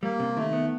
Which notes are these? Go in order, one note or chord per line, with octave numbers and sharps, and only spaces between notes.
G3 A#3
C3
D#3 A3
B3